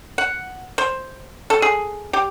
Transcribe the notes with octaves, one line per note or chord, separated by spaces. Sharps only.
F#5
C5
A4
G#4
G4